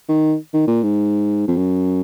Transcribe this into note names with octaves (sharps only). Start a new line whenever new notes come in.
D#3
D#3
A#2
G#2
F2
F#2